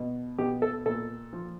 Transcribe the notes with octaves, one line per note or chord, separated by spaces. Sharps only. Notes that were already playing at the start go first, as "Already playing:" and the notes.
Already playing: B2
B2 G4
A4
A#2 A4
F3